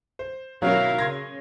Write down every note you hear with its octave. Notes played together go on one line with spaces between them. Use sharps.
C5
B2 F#3 E4 A#4 C#5 F5
C#3 C6 G#6 A#6